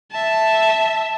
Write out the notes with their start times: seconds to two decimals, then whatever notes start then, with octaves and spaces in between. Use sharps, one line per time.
0.12 E5 A5